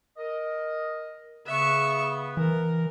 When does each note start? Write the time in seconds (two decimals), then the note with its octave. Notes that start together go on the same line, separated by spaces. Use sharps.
0.18 A#4 D#5
1.47 C#3 B3 E5 C#6
2.37 E3 A#4